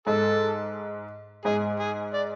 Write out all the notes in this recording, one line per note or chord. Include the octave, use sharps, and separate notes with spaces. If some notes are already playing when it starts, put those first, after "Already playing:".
G#2 A4
G#2 G#4
G#4
D5